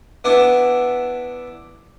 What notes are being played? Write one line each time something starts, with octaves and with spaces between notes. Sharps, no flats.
B3 D4 E4